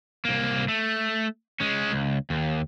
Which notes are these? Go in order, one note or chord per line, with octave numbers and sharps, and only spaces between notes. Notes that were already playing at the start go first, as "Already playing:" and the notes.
C2 A#3
A3
G#3 C#4
C#2
D#2